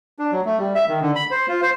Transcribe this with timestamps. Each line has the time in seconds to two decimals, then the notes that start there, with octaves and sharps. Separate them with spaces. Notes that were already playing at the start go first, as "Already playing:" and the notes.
0.19 D4
0.32 F#3
0.45 A3
0.59 G3
0.75 E5
0.88 D#3
1.01 D3
1.15 B5
1.31 C5
1.49 F4
1.62 C5